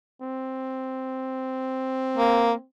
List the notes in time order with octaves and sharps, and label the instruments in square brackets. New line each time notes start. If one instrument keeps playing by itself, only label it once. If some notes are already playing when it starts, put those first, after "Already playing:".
[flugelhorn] C4
[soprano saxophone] A#3